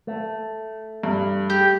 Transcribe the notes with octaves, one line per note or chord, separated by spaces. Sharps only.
A3
G2
G4